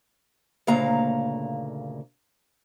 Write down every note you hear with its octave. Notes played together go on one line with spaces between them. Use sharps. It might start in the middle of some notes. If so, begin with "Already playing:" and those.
D2 A#2 C#3 A#3 F5 A#5